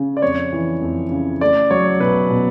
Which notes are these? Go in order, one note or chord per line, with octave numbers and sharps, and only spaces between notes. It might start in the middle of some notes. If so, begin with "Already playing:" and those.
Already playing: C#3
D5
F2 C#5
E3
F2
C#3
A3 D5
F#3 C#5
B1 B4
B2